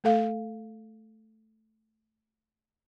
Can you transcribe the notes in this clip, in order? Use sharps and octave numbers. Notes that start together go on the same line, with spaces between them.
A3 A4 F5